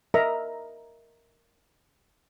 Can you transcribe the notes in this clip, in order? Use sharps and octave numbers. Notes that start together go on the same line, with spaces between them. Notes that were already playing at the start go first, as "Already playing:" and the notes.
A#4 D#5 E5 A#5